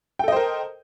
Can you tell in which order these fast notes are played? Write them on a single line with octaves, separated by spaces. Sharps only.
G5 A4 D#5 C5 A#4